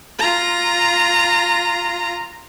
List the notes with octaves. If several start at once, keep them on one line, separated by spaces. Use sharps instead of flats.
F4 A#5